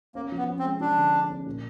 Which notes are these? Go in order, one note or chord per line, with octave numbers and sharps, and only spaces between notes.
A#3 C#4
F3
B3
C#4
C4
G#3
F3 D4
D3
C#4
C#4
A#2